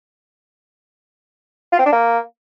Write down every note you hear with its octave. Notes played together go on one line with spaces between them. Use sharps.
F4
C4
D4
A#3